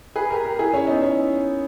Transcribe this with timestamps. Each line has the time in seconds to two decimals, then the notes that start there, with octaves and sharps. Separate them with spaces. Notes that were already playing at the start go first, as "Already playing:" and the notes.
0.16 G#4 B4
0.30 G4 A#4
0.44 G4 A#4
0.59 E4 G#4
0.73 C#4 E4
0.87 B3 D#4
1.02 C#4 E4